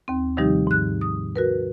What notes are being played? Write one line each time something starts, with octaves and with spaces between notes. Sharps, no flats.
D#2 C4
C3 D#3 F3 G3 D#4 G4
G#2 F#6
D#6
F#4 A#4 B4